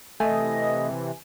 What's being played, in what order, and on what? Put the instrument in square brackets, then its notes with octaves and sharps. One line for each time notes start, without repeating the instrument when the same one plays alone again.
[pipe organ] C3 E3 [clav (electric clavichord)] A3 [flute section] D#5 D#6 [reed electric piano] G#5